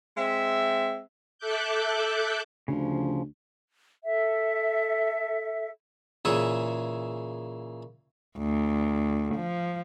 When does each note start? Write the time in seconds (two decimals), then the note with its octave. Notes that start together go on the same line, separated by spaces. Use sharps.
0.17 G#3 C4 E5
1.39 A4 E5 D6 F#6 G6
2.68 D2 C#3 F3
4.05 A4 E5
6.25 A#2 C#3 E3 G#4 E5 C#6
8.39 D2
9.35 F3